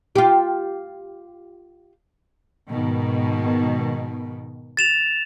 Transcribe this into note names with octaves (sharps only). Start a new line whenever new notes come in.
F4 G4
G#2 B2 D#3
A6 E7 F7